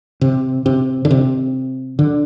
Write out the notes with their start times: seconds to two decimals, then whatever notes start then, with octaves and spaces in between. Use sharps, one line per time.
0.21 C3
0.66 C3
1.05 D3
1.11 C3
1.99 D3